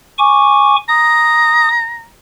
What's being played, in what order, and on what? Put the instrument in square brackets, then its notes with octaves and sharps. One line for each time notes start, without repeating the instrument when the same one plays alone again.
[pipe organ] G#5 C#6 D6
[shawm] A#5 [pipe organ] D#6